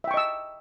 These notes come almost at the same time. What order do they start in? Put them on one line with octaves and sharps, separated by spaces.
E5 G5 C#6 D#5 E6